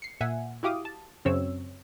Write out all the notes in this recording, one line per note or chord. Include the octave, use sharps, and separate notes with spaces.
C7 C#7
A#2 E5 F#5 G#5
E4 F#4 G4 F5 D6 D#6
A5
F#2 C#3 F#3 C4 C#5 E6